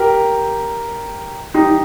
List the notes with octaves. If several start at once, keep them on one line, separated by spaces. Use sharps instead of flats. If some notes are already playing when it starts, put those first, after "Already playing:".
Already playing: G4 A#4
D#4 G4